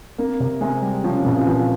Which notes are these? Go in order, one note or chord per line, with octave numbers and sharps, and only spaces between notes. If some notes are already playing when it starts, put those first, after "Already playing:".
A#3 C4
C3
C3 G#3
G3
F3 C#4
C3
A#2 C#3
E3
A#2 F3